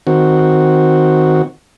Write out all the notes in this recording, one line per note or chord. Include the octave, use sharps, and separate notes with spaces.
D#3 C4 F#4